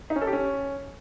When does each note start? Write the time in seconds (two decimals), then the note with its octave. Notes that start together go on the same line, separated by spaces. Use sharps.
0.10 D#4
0.16 C#4
0.21 A4
0.27 G4
0.33 C#4